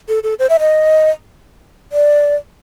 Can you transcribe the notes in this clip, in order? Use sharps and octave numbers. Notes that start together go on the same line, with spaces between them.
A4
A4
C5
E5
D#5
D5